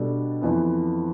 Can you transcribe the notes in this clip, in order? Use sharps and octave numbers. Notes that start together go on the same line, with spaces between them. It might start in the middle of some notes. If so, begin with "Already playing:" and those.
Already playing: B2 G3 D4 A4
F2 E3 B3